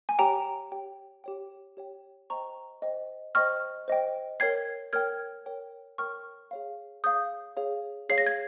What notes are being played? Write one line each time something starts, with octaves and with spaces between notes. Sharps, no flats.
G#5
G4 C#5 G5 A#5
G4 C#5 G5
G4 C#5 G5
G4 C#5 G5
C5 D#5 G5 A#5 C#6
C5 D#5 G5
C5 D#5 G5 C#6 F6
C5 D#5 G5
A#4 C#5 G5 G#6 C7
A#4 C#5 G5 F6 G#6
A#4 C#5 G5
A#4 C#5 G5 C#6 F6
G#4 C#5 F5
G#4 C#5 F5 D#6 G6
G#4 C#5 F5
G#4 C#5 F5 C7
A#6
G#6